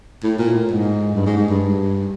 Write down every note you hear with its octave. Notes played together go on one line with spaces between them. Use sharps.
A2
A#2
A2
G#2
G2
G#2
G#2
G2